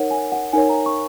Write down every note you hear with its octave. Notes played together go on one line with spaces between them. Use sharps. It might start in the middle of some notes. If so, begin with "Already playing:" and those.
Already playing: D#4 A#4 C#5 F#5
G#5
F#5
D#4 A#4 C#5 G#5
A#5
C#6